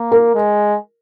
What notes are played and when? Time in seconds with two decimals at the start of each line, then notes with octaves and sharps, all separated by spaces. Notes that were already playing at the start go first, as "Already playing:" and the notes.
Already playing: A#3
0.12 A#4
0.34 G#3